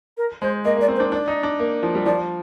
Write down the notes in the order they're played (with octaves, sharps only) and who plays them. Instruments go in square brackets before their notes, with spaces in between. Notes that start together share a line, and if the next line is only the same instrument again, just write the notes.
[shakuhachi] A#4
[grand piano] G#3 [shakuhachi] C5
[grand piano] A#3 [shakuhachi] D#5
[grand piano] A#3
[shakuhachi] D5
[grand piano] C4
[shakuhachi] C5
[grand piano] D4
[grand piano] D4 [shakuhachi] D5
[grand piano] D#4
D4
A#3
F3
G3
[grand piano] F3 [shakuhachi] D5